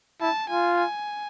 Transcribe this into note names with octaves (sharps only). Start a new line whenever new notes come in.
E4 A5
F4 G#5
G#5